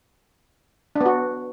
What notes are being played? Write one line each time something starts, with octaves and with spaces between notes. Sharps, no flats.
D4
B3
F#4